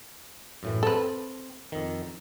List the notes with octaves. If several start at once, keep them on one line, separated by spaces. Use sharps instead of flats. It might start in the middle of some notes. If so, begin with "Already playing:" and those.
F#2 A2 E3
C4 A4 B4
F2 D#3